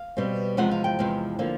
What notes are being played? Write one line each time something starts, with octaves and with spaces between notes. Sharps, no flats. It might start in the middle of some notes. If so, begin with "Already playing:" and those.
Already playing: F5
B2 G3 C4
E2 C3 F3 G#3 C4 F#5
F5
G5
E2 C3 F3 G#3 C4
D3 F3 A#3